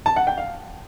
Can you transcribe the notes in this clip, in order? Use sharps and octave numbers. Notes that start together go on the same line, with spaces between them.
A5
F#5
G5
F5